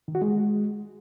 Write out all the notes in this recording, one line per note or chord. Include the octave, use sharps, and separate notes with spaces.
D#3
F#4
G#3